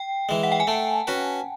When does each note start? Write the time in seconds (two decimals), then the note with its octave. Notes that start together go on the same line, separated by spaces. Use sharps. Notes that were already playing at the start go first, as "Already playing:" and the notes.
Already playing: G5
0.29 E3 G#3
0.43 F#5
0.52 G5
0.60 G#5
0.67 A3 A5
1.07 C#4 F#4 B4